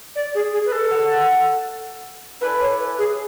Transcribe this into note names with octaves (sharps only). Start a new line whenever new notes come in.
D5
G#4
G#4
B4
A4
F#4 C#5 F#5
E4 A4 B4 D5 G#5
C#5
B4
G#4